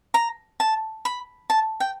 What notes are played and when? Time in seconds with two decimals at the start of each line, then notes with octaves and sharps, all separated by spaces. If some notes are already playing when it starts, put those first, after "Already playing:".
0.14 A#5
0.60 A5
1.05 B5
1.50 A5
1.80 G5